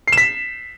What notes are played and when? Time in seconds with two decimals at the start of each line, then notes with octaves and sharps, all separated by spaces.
0.08 C7
0.13 E7
0.18 B6